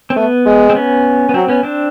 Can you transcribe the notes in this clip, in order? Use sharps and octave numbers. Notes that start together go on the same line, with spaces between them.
C4
A3 B3
G#3
C4
B3 C#4
B3
F#3 C4
B3 C#4
C4 D4